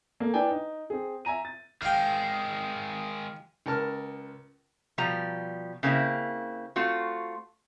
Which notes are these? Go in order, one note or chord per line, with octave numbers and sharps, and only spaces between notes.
A3 A#3
D4 E4 B4 G5 G#5
D#4
C4 G#4
E5 G#5 A#5 D#7
A6
D#3 G#3 F5 G5
C#2 A#4 A5 F6
B2 F3 G3 A#5
C#3 A#3 C4 E4
A3 C4 F4 F#4